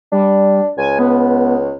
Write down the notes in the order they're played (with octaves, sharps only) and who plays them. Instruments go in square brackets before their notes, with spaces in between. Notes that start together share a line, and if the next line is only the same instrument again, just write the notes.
[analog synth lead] G3 [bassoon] D4
[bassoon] C#2 [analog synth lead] G#5
[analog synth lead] B3